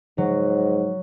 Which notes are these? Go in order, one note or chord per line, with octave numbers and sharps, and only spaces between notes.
G#2 F#3